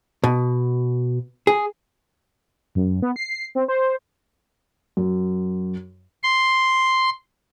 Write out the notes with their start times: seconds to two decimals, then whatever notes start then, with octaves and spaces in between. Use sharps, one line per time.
0.24 B2
1.47 G#4
2.75 F#2
3.02 B3
3.16 C7
3.55 C4
3.68 C5
4.97 F#2
6.23 C6